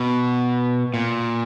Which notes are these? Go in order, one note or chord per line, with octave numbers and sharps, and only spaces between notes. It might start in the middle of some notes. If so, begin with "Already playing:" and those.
Already playing: B2
A#2